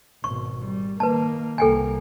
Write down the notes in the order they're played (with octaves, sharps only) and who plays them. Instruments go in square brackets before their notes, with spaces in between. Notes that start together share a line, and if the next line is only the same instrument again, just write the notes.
[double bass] G#1 B2 [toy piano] C#6
[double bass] G3
[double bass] D#3 A#3 [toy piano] B4 A5
[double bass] C2 A#3 [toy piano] A4 G5 G#5